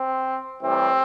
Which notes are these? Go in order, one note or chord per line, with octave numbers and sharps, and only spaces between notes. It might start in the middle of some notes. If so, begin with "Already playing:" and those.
Already playing: C4
A2 E3 G3 C4